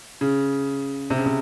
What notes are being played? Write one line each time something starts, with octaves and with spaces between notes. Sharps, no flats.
C#3
C3
C#3
C3